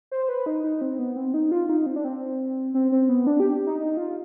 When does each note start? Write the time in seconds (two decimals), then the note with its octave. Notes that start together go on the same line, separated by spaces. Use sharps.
0.11 C5
0.29 B4
0.46 D#4
0.64 D#4
0.81 C4
0.99 B3
1.17 C4
1.34 D#4
1.51 F4
1.69 D#4
1.86 C4
1.96 D4
2.04 C4
2.74 C4
2.92 C4
3.09 B3
3.27 D4
3.40 G4
3.66 D#4
3.79 D#4
3.97 F4